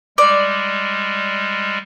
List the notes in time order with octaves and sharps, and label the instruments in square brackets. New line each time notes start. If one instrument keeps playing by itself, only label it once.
[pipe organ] G3 G#3 [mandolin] D5